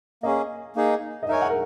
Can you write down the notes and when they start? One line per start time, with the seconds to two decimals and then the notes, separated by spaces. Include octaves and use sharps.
0.23 A#3 C#4 G#4 D#5
0.76 A#3 D#4 G#4
1.23 D#5
1.29 D#4 A#4 C#5 E5 G#5
1.41 F#5
1.50 A#4